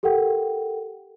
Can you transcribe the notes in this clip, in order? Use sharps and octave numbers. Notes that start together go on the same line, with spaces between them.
G4 A4 A#4 F#5 G5